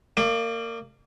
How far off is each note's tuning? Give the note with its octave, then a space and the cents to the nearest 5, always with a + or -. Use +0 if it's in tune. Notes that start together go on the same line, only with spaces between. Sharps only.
A#3 -25 D5 +35